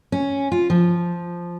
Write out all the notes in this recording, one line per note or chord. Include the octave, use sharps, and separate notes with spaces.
C#4
F4
F3